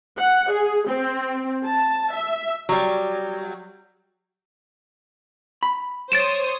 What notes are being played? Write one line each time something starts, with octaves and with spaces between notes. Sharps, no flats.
F#5
G#4
C4
A5
E5
F#3 G3
B5
C5 C#5 D#6 A6 D7 E7